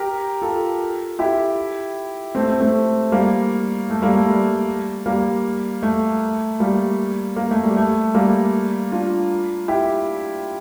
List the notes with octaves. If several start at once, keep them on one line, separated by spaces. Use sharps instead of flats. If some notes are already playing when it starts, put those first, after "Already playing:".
Already playing: G4 A#4
F4 A4
E4 G4
A3 C4
A3
A3 C4
G3 A#3
A3
G3 A#3
A3
G3
G3 A#3
A3
G3 A#3
A#3
A3
G3
A3
G3 A#3
D4 F4
E4 G4